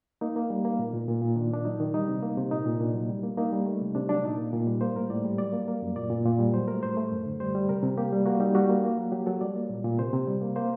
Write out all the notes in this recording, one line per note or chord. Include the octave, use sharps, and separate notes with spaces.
A#3 D#4
A#3
G3
A#3
A#2
A#2
A#2
A#2
D#3 D4
A#3 D4
F#3 D#4
D#3
G3 D#4
C3
A#3
C3
A#2 D#4
A#2
A#2 D4
F#3
G3
A#3
A#3 D#4
G3
A3
C3
C3 D4
F#3 D4
A#2 D#4
A#3
A#2
G3
A#3 C5
A2 A#4
A2 D5
G3
F#3 D5
A#3
A#3
F#2
A#2 D5
A#2
A#2
G3
F#3 C5
A3 A#4
A2 C5
A3
F#2
D3
G3 C5
G3
C3 A#4
C3
A#3 G4
G3
A#3 F#4
G3 D#4
G3 F#4
A#3
A#3
F#3
F#3 G4
F#3 A4
G3 D5
A#3
A#2
A#2
C3 C5
C3
G3
A#3
A#3 C5